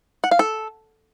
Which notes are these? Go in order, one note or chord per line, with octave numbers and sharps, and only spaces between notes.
F#5
F5
A4